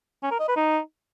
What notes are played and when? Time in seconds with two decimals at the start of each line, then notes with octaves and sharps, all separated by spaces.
0.23 C#4
0.31 A#4
0.40 D#5
0.48 B4
0.57 D#4